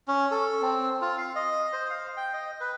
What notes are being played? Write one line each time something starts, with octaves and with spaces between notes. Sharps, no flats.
C#4
A4
C4
F4
F5
D#5
C5
F5
G5
D#5
B4